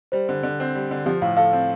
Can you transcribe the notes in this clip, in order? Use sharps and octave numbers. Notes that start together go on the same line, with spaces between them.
G3 C5
D3
D3
C4
G3
D3
F3 G4
A2 F5
A4 F5
C4